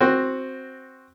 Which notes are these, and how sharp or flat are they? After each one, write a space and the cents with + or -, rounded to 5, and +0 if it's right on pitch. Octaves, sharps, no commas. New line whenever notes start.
C4 +5 F#4 +0